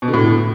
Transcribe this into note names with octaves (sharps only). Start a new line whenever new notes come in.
B2
D3
A2